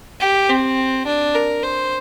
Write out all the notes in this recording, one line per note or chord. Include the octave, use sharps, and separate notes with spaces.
G4
C4
D4
A#4
C5